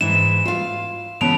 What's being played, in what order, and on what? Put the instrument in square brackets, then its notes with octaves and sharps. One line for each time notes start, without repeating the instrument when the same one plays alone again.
[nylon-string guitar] G#2 E3 E4 [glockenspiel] E7
[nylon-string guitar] F4 F5
[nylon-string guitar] C#3 E3 B3 [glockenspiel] A5 D7 F7